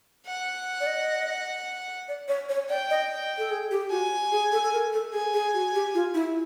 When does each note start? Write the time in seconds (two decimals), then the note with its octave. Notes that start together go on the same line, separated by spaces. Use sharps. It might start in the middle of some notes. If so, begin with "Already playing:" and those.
0.26 F#5
0.80 D5
0.87 D#5
2.08 D5
2.28 C#5
2.49 C#5
2.69 D5 G5
2.90 D#5
3.38 A4
3.51 G#4
3.71 G4
3.91 F#4 G#5
4.32 G#4
4.52 A4
4.63 A4
4.73 A#4
4.93 A4
5.13 G#4 G#5
5.34 G#4
5.54 F#4
5.74 G4
5.94 F4
6.14 E4